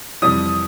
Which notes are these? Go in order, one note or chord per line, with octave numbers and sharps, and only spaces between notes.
F2 C3 E3 G3 D#6